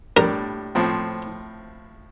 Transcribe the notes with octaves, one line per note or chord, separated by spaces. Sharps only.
A2 G3 D4 A#4
A2 F3 C4